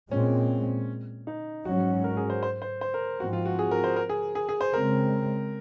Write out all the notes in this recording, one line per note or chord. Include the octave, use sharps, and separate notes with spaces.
A#2 G#3 C4 C#4
D#4
G#2 F#3 C#4 F#4
A#4
G#4
C5
C5
C5
C5
A#4
G#2 F3 C4 F#4
F4
F#4
G#4
A#4
C5
A#4
G#4
G#4
G#4
C5
C#3 G#3 C4 A#4